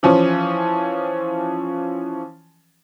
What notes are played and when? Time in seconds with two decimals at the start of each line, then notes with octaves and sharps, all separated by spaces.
0.03 E3 F3 C#4